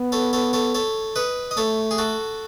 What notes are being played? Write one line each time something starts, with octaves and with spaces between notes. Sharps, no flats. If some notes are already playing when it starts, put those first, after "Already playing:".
Already playing: B3
A4 C#5
A4 C#5
A4 C#5
A4 C#5
B4 D#5
D#5
A3 A4 C#5
G#4
F#4 A4